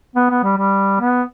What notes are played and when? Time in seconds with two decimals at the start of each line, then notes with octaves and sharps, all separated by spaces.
0.16 B3
0.30 B3
0.43 G3
0.57 G3
1.00 B3